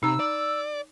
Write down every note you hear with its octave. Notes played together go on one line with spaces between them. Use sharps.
C3 D#4 A#5 E6
D5